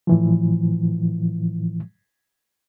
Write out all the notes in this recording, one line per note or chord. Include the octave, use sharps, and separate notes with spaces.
A2 E3 F3